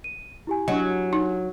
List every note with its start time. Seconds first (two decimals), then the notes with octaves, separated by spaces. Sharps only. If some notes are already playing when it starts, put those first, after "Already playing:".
0.04 D#7
0.47 E4 G4 G#5
0.68 F#3 D4 D#5
1.13 D#4